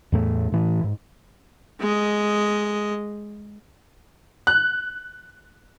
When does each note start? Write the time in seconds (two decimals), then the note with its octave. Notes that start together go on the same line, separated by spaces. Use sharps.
0.12 E2 A2 A3
0.52 A2 E3
0.84 G#2
1.80 G#3 D#5
4.47 F#6